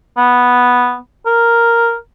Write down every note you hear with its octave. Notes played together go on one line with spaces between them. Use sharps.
B3
A#4